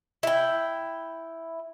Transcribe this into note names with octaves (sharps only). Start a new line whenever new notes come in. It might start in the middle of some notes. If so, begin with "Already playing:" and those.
E4 G5